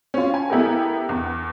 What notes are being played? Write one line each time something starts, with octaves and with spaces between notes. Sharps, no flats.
C#4 F4
G#5
B3 E4 G4 A4 A#4
E2